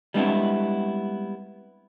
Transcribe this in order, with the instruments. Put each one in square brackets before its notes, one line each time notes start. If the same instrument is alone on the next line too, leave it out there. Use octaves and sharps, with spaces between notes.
[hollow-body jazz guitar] G3 G#3 B3 C4 D4 E4